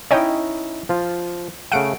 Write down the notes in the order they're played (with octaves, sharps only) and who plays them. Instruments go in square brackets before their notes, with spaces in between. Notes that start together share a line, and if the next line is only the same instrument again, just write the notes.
[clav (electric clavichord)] C#4 D#4 E4 [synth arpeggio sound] C#5 D#5 G5
[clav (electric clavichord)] F3 F4
[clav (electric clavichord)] C#3 A3 F5 [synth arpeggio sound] F#5 D7